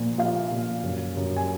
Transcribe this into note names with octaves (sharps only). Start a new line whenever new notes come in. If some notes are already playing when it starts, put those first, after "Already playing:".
Already playing: A#2 F3
F3 F5
A#2
F#2
F#2
G#5